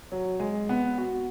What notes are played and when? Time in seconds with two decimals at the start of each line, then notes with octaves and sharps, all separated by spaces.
0.12 F#3
0.40 G#3
0.69 B3
0.98 F#4